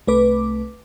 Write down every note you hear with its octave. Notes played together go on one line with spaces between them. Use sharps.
C2 A3 B4 D6